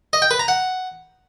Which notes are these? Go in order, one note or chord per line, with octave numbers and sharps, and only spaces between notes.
D#5
G5
B4
A#5
F#5